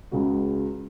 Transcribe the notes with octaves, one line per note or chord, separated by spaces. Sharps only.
C#2 C#3 G#3 F#4